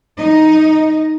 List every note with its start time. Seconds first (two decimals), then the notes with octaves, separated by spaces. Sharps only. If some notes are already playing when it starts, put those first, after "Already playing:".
0.18 D#4 D#5